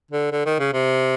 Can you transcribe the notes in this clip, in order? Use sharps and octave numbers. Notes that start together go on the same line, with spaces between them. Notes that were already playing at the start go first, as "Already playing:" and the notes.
D3
D3
D#3
C#3
C3